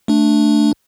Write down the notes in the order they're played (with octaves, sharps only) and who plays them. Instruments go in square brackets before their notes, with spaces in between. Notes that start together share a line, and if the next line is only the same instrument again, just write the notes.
[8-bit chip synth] A3 D4